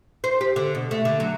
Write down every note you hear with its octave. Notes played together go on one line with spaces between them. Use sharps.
C5
G4
D3
B2
A3
D3
F#3